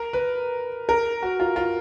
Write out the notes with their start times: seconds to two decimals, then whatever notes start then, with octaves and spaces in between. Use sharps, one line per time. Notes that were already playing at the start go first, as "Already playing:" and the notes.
Already playing: A#4
0.13 B4
0.89 A#4
1.22 F#4
1.40 F4
1.56 F4